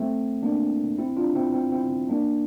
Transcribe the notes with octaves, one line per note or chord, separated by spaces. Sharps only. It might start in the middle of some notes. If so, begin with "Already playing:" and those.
Already playing: A3 C4
A#3 D4
C4 E4
D4 F4
C4 E4
C4 E4
C4 E4
A#3 D4